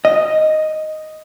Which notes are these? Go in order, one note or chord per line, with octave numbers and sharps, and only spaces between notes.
D#5